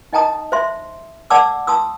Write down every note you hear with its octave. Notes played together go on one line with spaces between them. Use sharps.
D#4 D#5 G5 A5 A#5 D#6
C5 E5 C6
D5 F#5 A5 D6 E6
A5 C6 D#6 E6